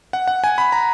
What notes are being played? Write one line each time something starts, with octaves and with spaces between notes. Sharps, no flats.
F#5
F#5
G#5
B5
A#5